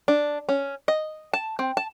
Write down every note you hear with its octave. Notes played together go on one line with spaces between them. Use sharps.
D4
C#4
D#5
A5
C4
A5